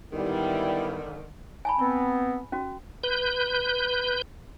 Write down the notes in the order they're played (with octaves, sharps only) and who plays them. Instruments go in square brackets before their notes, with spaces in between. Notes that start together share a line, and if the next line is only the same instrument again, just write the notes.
[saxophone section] G#2 D3 D#3 [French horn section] G3 [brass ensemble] B3 E4
[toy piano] G#5 A5 B5
[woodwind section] B3 C4 [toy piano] B5
[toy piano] C#4 F#4
[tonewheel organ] B4 G6